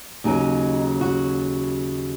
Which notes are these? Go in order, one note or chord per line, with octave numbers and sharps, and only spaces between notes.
D#2 C#3 F#3 D#4
F#4